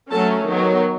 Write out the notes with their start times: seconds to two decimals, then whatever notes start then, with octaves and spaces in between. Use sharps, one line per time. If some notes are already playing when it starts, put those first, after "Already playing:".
0.11 F#3 A3 C#4 A4 A5
0.45 D#3 F#3 B3